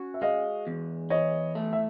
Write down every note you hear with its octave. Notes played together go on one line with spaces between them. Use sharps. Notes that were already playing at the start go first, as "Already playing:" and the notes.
Already playing: C#4 F#4
E5
G#3 D#5 F5
E2
E3 C#5 D#5
A3
E5